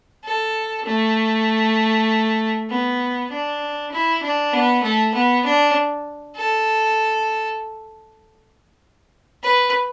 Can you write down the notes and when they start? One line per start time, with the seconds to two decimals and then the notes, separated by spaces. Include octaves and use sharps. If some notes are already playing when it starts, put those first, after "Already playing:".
0.24 A4
0.86 A3
2.69 B3
3.31 D4
3.92 E4
4.22 D4
4.53 B3
4.83 A3
5.14 B3
5.45 D4
6.37 A4
9.43 B4